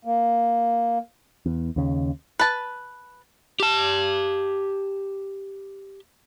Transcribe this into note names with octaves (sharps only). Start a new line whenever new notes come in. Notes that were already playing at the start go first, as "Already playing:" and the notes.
A#3
E2
D#2 C#3
B4 A5
G4 A5